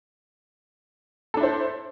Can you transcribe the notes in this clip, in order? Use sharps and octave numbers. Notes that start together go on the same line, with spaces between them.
D4 E4 A4 C5